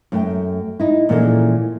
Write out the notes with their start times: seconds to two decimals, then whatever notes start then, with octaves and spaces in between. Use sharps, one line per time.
0.12 F#2 A3 G5
0.79 D#4 E4
1.09 A#2 E3 F3 C#4 G#4 A4